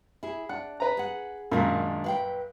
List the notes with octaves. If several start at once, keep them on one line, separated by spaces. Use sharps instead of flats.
E4 G#4
D4 F#5
B4 A#5
G#4 F#5
F#2 A#2 D#3 G#3 D4
B4 F5 G5